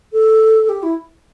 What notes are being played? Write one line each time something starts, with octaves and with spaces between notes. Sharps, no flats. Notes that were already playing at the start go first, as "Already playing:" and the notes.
A4
G4
E4